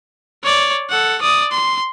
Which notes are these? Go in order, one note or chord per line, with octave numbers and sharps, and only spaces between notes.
C#5 D5
A4 F#5
D5 D#6
C6